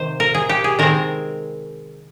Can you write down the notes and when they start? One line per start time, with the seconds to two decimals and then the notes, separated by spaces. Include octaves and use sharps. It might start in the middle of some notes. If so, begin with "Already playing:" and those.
Already playing: C3 D#3 C5
0.20 A#4
0.34 G#4
0.49 G4
0.64 G#4
0.79 D#3 G#3 C4 A#4